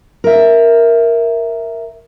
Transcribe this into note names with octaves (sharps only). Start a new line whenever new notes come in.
A#4 E5